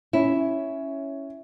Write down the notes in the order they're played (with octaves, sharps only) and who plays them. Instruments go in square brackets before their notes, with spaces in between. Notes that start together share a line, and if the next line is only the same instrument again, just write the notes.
[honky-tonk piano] C#4 [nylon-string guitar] E4